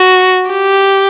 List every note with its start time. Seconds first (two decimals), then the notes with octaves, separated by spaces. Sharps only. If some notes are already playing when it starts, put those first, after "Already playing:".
Already playing: F#4
0.50 G4